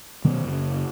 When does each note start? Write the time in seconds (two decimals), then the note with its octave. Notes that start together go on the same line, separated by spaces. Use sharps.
0.24 B2 D#3 F#3 B3
0.45 F#1